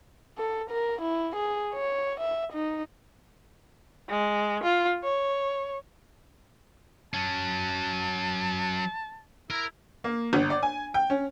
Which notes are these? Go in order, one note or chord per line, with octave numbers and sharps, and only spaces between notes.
A4
A#4
E4
G#4
C#5
E5
D#4
G#3
F4
C#5
F#3 C#4 A5
E4 A#4 A#5
A#3
G1
D5
G#5
G5
C#4